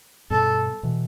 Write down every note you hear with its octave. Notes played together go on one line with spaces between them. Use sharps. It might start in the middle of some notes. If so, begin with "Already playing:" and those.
G2 B2 A4
B2 E3